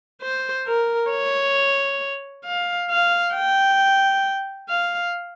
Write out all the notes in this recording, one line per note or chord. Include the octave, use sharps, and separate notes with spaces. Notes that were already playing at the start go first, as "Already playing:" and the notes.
C5
A#4
C#5
F5
F5
G5
F5